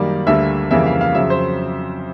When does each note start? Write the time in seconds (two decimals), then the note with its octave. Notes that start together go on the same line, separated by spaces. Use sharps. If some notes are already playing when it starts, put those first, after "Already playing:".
Already playing: F#2 D#3 G3 A#3 D5
0.26 D2 D3 G3 A#3 E5
0.71 F2 C#3 E3 G3 A#3 E5
0.86 F5
1.01 F5
1.15 F2 C#3 F#3 E5
1.30 C5